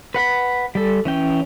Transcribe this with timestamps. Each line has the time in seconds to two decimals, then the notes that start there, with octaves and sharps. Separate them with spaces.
0.14 B4 F#5 B5
0.75 G3 A4
1.05 E3 C#4 G5